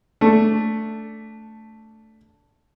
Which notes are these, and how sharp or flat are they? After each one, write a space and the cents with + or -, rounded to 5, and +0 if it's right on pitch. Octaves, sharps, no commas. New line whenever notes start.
A3 +0 D4 -15